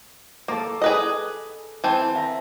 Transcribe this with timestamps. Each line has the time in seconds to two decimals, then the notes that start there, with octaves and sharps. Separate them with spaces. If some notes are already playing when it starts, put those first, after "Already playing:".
0.48 A#3 A4 D6
0.82 G#4 B4 D#5
1.84 E3 C4 A5
2.15 E5 A#5